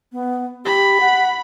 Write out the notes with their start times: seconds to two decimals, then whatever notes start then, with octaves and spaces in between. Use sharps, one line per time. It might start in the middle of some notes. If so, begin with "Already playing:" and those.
0.12 B3
0.65 G4 B5
1.00 F#5